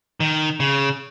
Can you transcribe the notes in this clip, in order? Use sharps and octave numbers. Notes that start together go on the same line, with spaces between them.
D#3
C#3